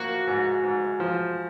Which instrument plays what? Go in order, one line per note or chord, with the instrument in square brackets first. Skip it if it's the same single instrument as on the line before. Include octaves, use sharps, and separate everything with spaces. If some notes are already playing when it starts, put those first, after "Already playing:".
Already playing: [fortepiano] F3 A#3 [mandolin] F#4
[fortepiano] G#2
G#2
F3